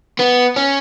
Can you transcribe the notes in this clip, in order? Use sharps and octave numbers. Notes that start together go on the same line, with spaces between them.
B3
C#4